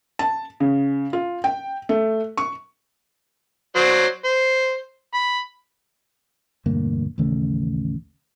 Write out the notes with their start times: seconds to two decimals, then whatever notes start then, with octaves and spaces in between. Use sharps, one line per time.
0.19 A5
0.60 C#3
1.13 F4
1.44 G5
1.89 A3
2.37 C#6
3.76 F#3 C5 D5
4.24 C5
5.14 B5
6.66 E1 D2 G2 A#3
7.18 A1 D#2 C#3 A3